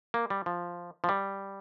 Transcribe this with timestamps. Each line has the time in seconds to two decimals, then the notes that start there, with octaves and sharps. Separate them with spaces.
0.14 A#3
0.30 G3
0.46 F3
1.04 F3
1.09 G3